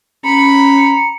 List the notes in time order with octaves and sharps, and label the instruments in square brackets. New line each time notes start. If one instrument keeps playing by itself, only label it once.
[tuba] C#4 [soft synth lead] A#5 [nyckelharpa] B5 [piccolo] C#7